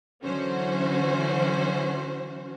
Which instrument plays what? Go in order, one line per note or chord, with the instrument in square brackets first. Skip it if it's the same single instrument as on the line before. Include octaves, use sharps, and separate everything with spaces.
[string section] D3 E3 F#3 C#4 F#4 C5